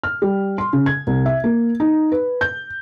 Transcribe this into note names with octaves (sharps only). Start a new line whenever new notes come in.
F6
G3
C6
C#3
G#6
C2
E5
A#3
D#4
B4
G6